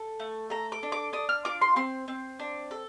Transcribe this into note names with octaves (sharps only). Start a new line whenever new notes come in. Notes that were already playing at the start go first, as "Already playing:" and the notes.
Already playing: A4
A3
A4 A#5
D6
D4
D6
D4 D#6
F6
F4 D6
C6
C4 C6
C4
D4
A4